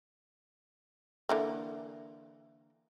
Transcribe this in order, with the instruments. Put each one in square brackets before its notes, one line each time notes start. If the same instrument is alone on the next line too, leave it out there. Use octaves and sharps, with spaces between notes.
[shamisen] D3 E3 A#3